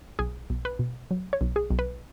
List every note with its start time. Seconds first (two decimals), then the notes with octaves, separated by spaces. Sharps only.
0.19 B1 G#4
0.50 B1
0.65 B4
0.79 B2
1.11 F#3
1.33 C#5
1.41 B1
1.56 G#4
1.70 B1
1.79 B4